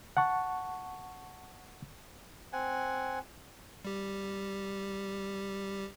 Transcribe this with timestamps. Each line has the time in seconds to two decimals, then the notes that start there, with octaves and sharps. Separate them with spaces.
0.17 F#5 A5 C#6
2.53 C4 F#5 G#5
3.85 G3 G4